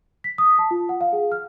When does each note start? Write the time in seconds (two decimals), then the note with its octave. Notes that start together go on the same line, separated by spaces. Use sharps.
0.24 B6
0.38 D#6
0.59 A5
0.71 F4
0.89 F#5
1.01 F5
1.13 G#4
1.32 F6